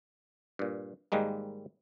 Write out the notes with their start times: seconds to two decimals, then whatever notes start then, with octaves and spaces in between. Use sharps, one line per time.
0.59 G2 A#2
1.12 G#2 D#3 G3 G#3 A#3